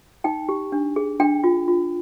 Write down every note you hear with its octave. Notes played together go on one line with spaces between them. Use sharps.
D#4 G5
G4
D4
G#4
D4 G5
F4
F4